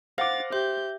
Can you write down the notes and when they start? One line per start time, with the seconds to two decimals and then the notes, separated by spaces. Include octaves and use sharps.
0.18 C5 F5 F#5 D6 A6 A#6
0.53 G4 C5 E5 G6